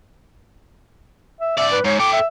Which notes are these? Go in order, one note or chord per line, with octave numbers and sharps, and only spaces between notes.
E5
G#2 D5 E5
B4
G#2 C#5
A4 G5 D6
E5